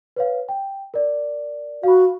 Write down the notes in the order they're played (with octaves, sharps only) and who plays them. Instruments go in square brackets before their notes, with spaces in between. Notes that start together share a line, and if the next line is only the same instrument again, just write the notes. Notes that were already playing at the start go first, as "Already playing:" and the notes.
[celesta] B4 C#5 F5
G5
A#4 D5
[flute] F#4 [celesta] F5 B5